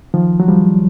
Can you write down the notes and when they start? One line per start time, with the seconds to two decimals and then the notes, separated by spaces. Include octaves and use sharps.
0.14 D#3 F3
0.40 F#3
0.48 F3 G3